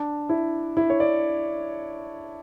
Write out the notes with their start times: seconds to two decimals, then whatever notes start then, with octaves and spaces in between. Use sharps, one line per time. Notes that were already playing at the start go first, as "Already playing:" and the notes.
Already playing: D4
0.29 E4
0.77 E4
0.90 C#5
1.00 D5